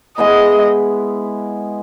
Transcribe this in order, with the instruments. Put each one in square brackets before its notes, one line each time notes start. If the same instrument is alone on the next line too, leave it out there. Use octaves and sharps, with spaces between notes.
[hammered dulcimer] G#3 B3 E4 [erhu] D#5